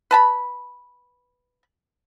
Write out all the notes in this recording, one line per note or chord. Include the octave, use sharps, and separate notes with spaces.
B4 A5 B5